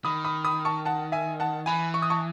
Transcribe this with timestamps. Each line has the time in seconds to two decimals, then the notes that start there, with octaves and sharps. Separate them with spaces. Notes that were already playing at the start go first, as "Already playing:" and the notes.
0.05 D#3 B5 D#6
0.25 B5 D#6
0.44 B5 D#6
0.65 A5 C#6
0.85 F#5 A5
1.12 E5 G#5
1.40 F#5 A5
1.66 E3 G#5 B5
1.94 C#6
2.02 D#6
2.10 A5 C#6